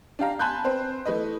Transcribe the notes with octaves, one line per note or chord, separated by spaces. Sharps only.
D4 G4 F5 A#5
G#5 A5 B5 C6 F#6 G6
C4 B4 C5
E3 A3 E4 B4 D#5